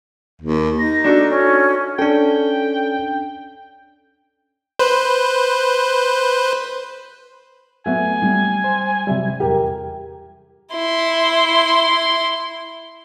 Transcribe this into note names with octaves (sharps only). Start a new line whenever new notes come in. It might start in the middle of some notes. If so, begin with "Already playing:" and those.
D#2
D#4 A#6
D4 F#4 A4
C#4
C#4 D4 A4 G5
B4 C5
F#3 A3 B3 E5 F#5 G#5
G3
C5
C3 F#3 G3 E5
E2 G4 A#4
E4 C6